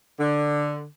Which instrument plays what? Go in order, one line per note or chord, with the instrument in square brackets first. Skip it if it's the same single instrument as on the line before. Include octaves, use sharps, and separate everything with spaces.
[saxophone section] D3